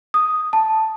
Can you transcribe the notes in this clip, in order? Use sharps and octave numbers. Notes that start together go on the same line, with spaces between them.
D#6
A5